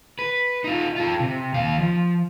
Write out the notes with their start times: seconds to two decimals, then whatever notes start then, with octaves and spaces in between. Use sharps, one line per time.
0.19 B4
0.64 D#4 F4
0.96 F4 A4
1.20 C3
1.54 D#2 F5
1.78 F3